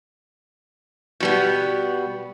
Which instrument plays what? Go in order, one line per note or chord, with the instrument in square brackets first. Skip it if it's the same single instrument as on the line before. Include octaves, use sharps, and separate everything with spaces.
[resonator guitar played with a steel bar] B2 G3 B3